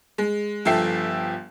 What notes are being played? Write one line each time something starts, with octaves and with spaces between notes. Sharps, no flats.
G#3
G1 F3 A4 E5 G5 C7